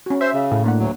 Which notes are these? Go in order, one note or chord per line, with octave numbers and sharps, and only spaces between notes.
C#4 F#4
C5 E5
C#3
A2
A#3 D4 F#5
D2 F#3